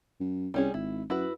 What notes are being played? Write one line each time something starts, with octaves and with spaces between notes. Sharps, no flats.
F#2
C2 G3 C#4 G#4
G#1 E4
F#2 E4 F#4 B4